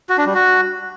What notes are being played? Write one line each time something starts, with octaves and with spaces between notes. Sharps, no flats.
F#4
D4
G3
F#4